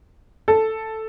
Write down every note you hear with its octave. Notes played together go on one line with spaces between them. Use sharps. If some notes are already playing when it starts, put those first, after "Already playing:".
A4